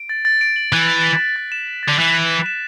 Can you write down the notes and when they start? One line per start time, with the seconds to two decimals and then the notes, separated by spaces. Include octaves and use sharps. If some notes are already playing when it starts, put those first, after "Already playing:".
Already playing: D7
0.09 A6
0.25 A6
0.41 D7
0.56 F#7
0.72 E3 F#6
0.88 F#6
1.04 B6
1.20 D7
1.36 A6
1.52 E7
1.67 E7
1.83 A6
1.88 D3
1.99 E3 F#6
2.14 F#6
2.30 B6
2.46 E7